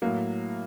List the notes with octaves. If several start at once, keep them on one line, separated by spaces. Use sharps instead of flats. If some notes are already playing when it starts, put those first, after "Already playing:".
A2 F#3 A#3